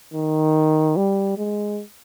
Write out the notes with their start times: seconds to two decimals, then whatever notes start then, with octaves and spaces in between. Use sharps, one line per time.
0.14 D#3
0.96 G3
1.38 G#3